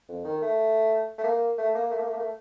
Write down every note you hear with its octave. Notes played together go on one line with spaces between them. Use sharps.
F2
D#3
A3
A3
A#3
A3
A#3
A3
A#3
A3
A#3
A3